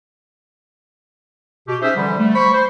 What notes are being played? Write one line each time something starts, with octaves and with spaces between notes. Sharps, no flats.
B2 G4
C#4 D#4 G#4 C5 E5
D3 E3 F3 G3
G3 A3
C5 B5 C#6
C5